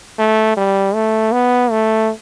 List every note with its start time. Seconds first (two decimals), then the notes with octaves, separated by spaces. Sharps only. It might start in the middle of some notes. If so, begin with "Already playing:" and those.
0.19 A3
0.57 G3
0.94 A3
1.32 B3
1.71 A3